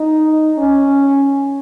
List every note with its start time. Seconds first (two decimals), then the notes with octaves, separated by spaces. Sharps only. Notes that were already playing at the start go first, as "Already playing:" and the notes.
Already playing: D#4
0.58 C#4